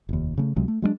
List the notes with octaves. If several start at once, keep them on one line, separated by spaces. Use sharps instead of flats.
F1 D#2
C#3 G#3 A3
C#2 C3 F#3 G#3
A3
F#3 G#3 A#3 D4